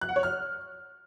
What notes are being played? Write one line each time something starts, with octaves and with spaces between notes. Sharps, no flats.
F#6
F#5
C#5
F6